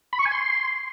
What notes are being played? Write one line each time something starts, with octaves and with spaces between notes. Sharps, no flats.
B5
C#6
G#5
C6